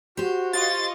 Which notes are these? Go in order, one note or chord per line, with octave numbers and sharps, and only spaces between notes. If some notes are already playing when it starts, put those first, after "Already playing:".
F#4 G4 C5
F4 D#5 C#6 A6